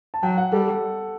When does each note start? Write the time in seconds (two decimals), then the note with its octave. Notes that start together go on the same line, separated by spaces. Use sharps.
0.14 A5
0.23 F#3 G5
0.38 F#5
0.52 G3 A4